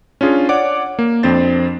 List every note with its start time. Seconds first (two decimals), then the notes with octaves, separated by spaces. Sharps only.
0.21 C#4 D4 F4 G#4
0.49 C#5 D5 F#5 D6
0.99 A#3
1.23 F2 C4 D4 C5 A6